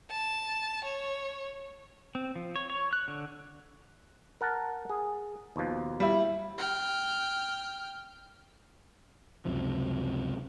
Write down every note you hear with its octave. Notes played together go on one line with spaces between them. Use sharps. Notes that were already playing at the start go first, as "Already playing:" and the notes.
A5
C#5
C4
F3
C#5
C#5
F#6
D3
A#4 F#5 A5
G#4
D#2 B2 F3
G3 E4
G5 F6
C#2 F#2 C3 F3